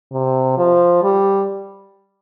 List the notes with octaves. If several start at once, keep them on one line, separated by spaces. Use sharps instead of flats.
C3
F3
G3